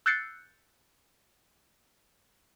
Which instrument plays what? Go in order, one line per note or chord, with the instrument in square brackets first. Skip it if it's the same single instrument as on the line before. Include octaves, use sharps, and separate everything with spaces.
[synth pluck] E6 F#6 G6 A6 C7 C#7